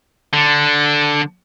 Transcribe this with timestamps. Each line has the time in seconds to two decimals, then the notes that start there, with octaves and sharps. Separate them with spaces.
0.33 D3